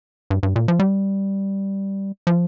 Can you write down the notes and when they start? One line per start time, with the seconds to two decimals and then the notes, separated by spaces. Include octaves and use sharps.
0.30 G2
0.43 G2
0.56 A#2
0.68 F3
0.80 G3
2.27 F3